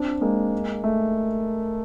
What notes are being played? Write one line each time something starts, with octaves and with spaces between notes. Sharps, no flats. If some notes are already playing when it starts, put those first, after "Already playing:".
Already playing: C4 D4
G#3 A#3
A3